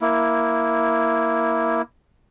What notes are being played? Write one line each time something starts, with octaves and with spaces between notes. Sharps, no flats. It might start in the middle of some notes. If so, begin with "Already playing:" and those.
A#3 E4